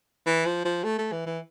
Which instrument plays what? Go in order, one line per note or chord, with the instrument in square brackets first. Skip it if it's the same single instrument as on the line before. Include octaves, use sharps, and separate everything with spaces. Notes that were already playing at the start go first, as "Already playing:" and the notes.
[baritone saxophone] E3
F3
F3
A3
A3
E3
E3